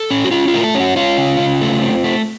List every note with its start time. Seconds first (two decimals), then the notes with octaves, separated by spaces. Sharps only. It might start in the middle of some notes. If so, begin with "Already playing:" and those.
Already playing: A4
0.10 C#4
0.25 F#4
0.31 C#4 F4
0.48 F4
0.54 A3 A#4
0.64 A4
0.75 C#4
0.80 F#4
0.96 C#4 F4
1.18 C#3
1.39 C#3
1.61 A3
1.82 C4
2.04 A3